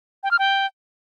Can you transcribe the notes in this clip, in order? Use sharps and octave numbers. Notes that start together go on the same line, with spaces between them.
G5
F6
G5